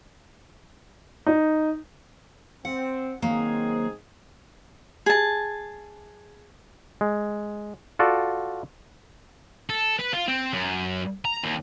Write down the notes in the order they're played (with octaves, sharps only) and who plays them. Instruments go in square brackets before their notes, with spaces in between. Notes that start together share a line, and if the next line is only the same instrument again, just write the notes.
[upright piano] D#4
[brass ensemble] C4 [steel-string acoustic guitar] F#5
[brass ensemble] G#2 C4 G#4 [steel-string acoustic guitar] D#3 F#3 A#3
[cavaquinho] G#4 A5
[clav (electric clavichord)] G#3
F4 F#4 A4 D5
[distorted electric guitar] A4
B4
F4
C4
F#2
A#5
D#2